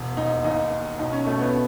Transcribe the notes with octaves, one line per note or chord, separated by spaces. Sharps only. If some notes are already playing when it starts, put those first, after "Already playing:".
Already playing: E1
D#2 D#4
D#2 D#4
D#3
B1 D#4
C#4
B2 A3
B3